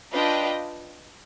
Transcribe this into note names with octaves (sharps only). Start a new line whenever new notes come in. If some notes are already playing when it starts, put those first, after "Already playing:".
D4 F4 B4 D#5 G5